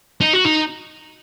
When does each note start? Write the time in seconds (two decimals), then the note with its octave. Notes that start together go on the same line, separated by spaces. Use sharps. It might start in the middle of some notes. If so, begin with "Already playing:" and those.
0.21 D#4
0.33 F#4
0.45 D#4